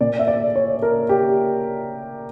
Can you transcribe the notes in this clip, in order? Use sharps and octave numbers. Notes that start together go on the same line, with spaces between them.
A#2 D5
E5
D5
C#5
A#4
G4